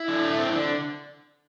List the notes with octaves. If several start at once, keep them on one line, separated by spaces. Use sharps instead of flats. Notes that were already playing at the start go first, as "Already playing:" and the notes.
Already playing: E4
D3
A3
C4
D3